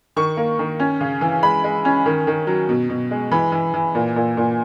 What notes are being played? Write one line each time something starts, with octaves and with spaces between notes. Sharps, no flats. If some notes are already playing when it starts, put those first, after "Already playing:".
D#3 C#6
A#3
D#3
C#4
C#3
E3
G#3 B5
G#3
C#4
D#3
D#3
F#3
B2
B2
G#3
E3 B5
E3
E3
A#2
A#2
A#2